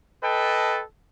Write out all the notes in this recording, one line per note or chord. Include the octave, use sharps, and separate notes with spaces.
A4 B4 D#5 G5 A5